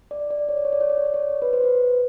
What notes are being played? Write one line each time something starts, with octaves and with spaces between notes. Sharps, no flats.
D5
D5
C#5
D5
C#5
D5
C#5
D5
C#5
D5
C#5
B4
C5
B4